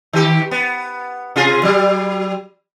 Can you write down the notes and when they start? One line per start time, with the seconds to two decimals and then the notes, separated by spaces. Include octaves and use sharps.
0.13 D#3 G4
0.51 B3
1.36 C3 F4 G#4
1.63 F#3 G3